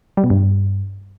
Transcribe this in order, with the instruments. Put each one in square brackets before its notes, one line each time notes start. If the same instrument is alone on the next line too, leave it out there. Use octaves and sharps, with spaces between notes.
[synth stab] G3
B2
G2